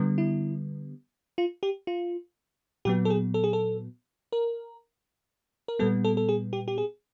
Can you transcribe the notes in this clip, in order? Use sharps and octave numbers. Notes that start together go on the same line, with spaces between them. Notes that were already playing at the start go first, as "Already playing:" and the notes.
Already playing: D3 G3 B3
E4
F4
G4
F4
A#2 F#3 B3 G4
A4
G#4
A4
G#4
A4
A#4
A#4
A#2 G3 B3 A4
A4
A4
G#4
G4
G4
G#4